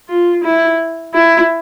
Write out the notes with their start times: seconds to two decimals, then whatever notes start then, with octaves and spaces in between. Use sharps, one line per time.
0.09 F4
0.44 E4
1.14 E4